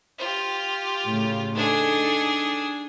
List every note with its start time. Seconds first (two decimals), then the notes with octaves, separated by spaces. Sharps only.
0.18 F4 G4
1.06 A2 C#3
1.55 D4 D#4 G#4 A4